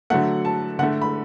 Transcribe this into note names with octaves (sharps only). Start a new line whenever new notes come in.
D3 F#3 A3 F#5
A5
D3 A3 F#5
B5